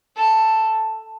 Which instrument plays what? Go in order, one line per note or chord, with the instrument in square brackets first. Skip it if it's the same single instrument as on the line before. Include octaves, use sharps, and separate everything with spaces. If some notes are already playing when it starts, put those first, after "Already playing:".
[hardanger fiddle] A4